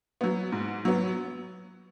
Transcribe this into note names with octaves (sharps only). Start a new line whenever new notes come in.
F#3 B3
G#2
F#3 B3